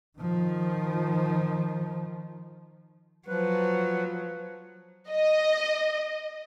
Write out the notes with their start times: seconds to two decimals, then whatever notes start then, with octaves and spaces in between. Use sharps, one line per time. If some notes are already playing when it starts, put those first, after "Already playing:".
0.18 D#3 F3
3.28 F3 F#3 B4
5.10 D#5